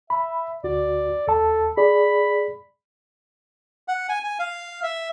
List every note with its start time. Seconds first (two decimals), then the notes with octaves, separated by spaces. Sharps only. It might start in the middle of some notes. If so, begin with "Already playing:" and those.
0.10 E5 B5
0.64 D2 F#4 D5
1.28 D#2 A4 A5
1.77 G#4 D5 B5
3.88 F#5
4.09 G#5
4.24 G#5
4.39 F5
4.83 E5